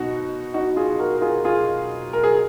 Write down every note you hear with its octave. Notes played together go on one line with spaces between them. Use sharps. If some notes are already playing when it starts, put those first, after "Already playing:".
Already playing: B2 D#4 F#4
D#4 F#4
F4 G#4
F#4 A#4
A#4
F4 G#4
F4 G#4
A#4
G#4